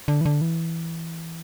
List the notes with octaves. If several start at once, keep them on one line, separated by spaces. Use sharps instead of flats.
D3
E3
D3
E3